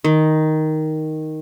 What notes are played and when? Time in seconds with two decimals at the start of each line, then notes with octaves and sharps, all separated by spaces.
0.04 D#3